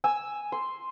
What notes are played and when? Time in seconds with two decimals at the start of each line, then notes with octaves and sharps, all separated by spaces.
0.04 G#5 E6
0.52 C6